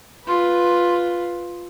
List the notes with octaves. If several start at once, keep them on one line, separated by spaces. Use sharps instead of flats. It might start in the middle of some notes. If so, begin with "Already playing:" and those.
F4 B4